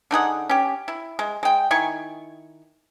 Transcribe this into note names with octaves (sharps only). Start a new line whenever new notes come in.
D3 D#4 G#4 F#5
C#4 G4
E4
G#3
G#3 G5
D#3 E4 G#5 C#6